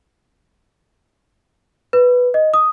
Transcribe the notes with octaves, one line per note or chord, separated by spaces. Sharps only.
B4
D#5
D#6